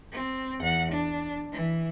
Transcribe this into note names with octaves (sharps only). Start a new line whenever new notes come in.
C4
E2 F#5
D4
E3